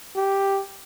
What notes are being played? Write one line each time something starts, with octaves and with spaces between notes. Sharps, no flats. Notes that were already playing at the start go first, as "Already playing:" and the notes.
G4